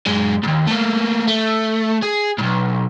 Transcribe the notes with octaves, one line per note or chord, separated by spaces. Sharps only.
F#2 G#3
D#2 G#2
A3 A#3
A3
G#4
B1 G#2